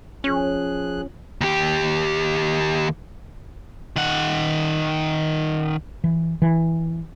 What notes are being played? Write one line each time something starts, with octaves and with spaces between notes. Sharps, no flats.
F3 C#4 G#4 F#6
D#2 G4
D#3 F#5
E3
E3